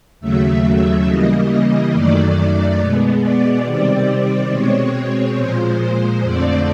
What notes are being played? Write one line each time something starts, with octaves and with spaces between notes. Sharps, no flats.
D#2 C#3 F#3 A3 E5
C#3 E3 G3 A#3 D#5
D#5
F#2 D#3 F#3 A3 D5
B2 G#3 B3
D5
C3 D#3 G3 C4
B2 G#3 C4 C#5
A#2 F3 G#3 C5
C5
F2 D3 F3 A3 C4 D5